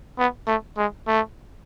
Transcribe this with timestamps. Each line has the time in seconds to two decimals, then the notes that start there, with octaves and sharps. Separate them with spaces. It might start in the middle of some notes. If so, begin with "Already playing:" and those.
0.18 B3
0.47 A3
0.77 G#3
1.07 A3